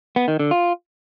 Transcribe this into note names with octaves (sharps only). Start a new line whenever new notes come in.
B3
D#3
D3
F4